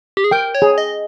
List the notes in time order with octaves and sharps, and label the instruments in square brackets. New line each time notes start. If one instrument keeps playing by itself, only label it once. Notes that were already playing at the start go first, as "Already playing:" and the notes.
[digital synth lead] G4
G#4
[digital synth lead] A#4 [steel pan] G5
[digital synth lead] C#5
[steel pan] G#4
[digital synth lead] D#5